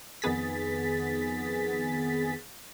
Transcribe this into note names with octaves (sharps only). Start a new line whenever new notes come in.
F2 D#3 B3 G#4 A6 B6